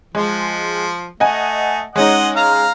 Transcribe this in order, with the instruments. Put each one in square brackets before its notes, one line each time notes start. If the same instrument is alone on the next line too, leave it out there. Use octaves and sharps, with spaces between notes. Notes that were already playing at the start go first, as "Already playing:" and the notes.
[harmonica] F3 [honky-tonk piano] G#3
[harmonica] A3 [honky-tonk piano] D#5 F#5 G#5
[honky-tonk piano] G#3 C#4 D#4 [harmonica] D#5 F#5
[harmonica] F5 A#5